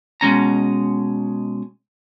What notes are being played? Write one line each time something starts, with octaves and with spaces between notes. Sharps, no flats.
B2 G#3 C#4 A#5